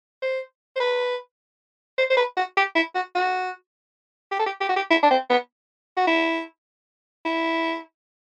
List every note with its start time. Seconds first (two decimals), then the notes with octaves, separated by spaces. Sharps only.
0.22 C5
0.76 C5
0.80 B4
1.98 C5
2.10 C5
2.17 B4
2.37 F#4
2.57 G4
2.75 E4
2.95 F#4
3.15 F#4
4.31 G4
4.39 A4
4.46 G4
4.61 G4
4.69 F#4
4.76 G4
4.91 E4
5.03 D4
5.11 C4
5.30 B3
5.97 F#4
6.07 E4
7.25 E4